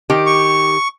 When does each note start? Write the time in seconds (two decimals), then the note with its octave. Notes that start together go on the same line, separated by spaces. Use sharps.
0.10 D#3 G4
0.26 C#6